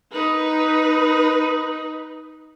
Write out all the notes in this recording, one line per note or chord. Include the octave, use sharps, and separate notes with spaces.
D#4 B4